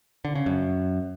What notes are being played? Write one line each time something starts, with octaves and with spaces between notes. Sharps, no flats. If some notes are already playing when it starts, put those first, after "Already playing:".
D3
C#3
F#2